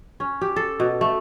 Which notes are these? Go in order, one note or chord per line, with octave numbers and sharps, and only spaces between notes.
C#4
G4
A4
B2
A3